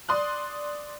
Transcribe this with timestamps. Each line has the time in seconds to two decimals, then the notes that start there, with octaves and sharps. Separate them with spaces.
0.09 D5 C6 D#6 F#6